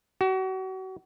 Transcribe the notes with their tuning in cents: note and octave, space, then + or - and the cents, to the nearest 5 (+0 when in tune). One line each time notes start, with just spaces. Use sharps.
F#4 +35